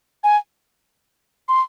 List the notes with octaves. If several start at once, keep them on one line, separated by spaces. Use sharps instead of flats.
G#5
C6